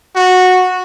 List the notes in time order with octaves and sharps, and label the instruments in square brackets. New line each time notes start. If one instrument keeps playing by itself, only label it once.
[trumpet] F#4